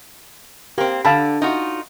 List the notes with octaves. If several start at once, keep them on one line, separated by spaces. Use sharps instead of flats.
A#3 C4 G4
D3 F5 A5 B5
D#4 F4 F#4